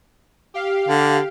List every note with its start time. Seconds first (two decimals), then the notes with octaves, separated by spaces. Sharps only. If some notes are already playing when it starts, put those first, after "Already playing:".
0.54 G4 F5
0.88 D3